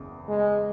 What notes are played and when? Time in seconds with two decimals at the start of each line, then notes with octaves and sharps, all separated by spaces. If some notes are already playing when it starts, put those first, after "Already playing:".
Already playing: F#1 E2 C#3
0.28 G#3